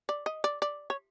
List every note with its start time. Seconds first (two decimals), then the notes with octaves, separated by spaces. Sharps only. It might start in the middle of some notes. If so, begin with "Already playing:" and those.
0.09 D5
0.26 D#5
0.44 D5
0.62 D5
0.90 C#5